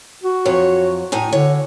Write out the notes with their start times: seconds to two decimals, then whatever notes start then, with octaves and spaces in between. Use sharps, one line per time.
0.23 F#4
0.45 F2 F#3 C#5
1.12 A2 D#4 G#5
1.33 D3 C#5